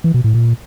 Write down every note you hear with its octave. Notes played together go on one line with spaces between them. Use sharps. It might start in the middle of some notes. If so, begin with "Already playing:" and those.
E3
B2
A2
A#2